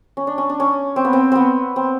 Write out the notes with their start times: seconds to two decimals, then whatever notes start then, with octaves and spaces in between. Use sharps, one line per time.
0.17 C#4
0.27 D4
0.38 C#4
0.50 D4
0.60 C#4
0.96 C4
1.05 B3
1.13 C4
1.32 B3 C4
1.76 C4